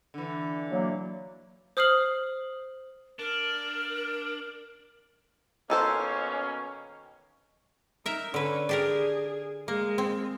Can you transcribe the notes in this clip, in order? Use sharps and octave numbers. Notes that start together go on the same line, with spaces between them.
D3 E3
F#3 A#3
C5 D#6 F6 C7 F#7
D4 A#4
B2 D#3 A#3 C#4 A4 C5
D#4 A#4 E5
D3 C#4 B4
D4 G4 G#4 A#4
G#3 A#3
C4